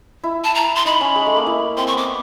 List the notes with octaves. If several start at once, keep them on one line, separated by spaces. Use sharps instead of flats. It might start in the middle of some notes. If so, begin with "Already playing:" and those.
E4
A5
A#5
C6
D#4 B5
C#4
G#3
A3
A#3
E4
C4 C6
C#6
B3 D6